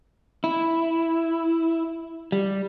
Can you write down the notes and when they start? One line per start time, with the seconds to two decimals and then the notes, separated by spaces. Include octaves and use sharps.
0.44 E4
2.32 G3